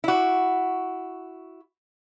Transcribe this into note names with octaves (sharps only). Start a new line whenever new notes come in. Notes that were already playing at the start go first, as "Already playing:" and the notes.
E4 F#4